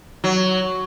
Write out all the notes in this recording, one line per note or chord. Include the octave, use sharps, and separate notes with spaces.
F#3